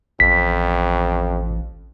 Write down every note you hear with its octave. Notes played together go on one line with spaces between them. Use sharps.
A1 F2 B6